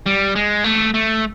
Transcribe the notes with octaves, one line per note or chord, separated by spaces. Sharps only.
G3
G#3
A3
A3